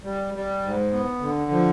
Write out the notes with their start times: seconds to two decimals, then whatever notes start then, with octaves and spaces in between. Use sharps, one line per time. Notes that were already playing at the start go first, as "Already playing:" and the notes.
0.04 G3
0.34 G3
0.64 G#2
0.93 B3
1.21 D3
1.51 F3